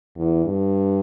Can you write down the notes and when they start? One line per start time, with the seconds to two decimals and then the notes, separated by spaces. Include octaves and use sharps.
0.16 E2
0.45 G2